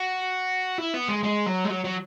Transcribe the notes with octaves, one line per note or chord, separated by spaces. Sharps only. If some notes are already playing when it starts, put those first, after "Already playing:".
Already playing: F#4
E4
B3
G#3
G#3
F#3
G#3
F#3
F#3